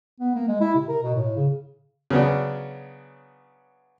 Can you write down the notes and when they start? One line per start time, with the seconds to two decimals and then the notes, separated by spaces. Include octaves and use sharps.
0.20 B3
0.35 A#3
0.48 G#3
0.60 E4
0.75 C3
0.88 A#4
1.03 B2
1.15 A2
1.36 C#3
2.10 C#3 F#3 B3 D4